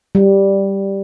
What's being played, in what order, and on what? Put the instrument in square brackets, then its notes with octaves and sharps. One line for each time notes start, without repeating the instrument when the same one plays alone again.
[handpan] G3